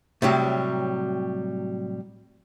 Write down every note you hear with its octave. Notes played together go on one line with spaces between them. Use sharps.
A2 C3 F#3 G3